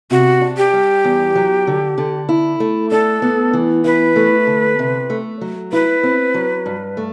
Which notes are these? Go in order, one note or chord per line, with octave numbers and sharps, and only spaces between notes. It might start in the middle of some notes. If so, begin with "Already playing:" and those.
C3 F#4
D4
G4
G3
E2
F#3
D3
D3
E4
A3
D4 A4
B3
E3
E4 B4
A3
D3
C3
A3
F#3
E4 B4
C4
F#3
G2
A3